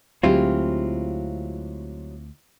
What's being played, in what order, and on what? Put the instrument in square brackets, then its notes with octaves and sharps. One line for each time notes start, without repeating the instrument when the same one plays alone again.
[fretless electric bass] D2 [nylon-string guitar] F#3 G#3 G4 [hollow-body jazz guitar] C4 E4 F4